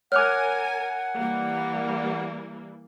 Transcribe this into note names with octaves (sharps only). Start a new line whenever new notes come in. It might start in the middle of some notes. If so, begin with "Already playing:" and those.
A#4 C#5 F#5 G#5 D6 F6 F#6 F7
E3 G3 A#3